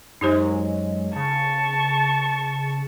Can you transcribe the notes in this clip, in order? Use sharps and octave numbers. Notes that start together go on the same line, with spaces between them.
F#2 F#3 G#3 D#4 G4 C5
C#3 A5 C#6